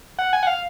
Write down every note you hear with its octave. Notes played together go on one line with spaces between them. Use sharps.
F#5
G#5
F#5
F5